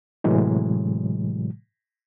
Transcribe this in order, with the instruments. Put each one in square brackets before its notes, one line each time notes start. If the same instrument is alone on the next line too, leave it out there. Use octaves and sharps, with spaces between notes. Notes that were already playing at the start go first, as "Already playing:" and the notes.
[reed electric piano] A2 C3 E3 F#3 G#3